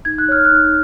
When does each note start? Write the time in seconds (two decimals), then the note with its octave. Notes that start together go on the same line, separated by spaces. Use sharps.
0.05 D#4 G#6
0.18 F#6
0.28 C#5 F6
0.45 F#6
0.51 D#4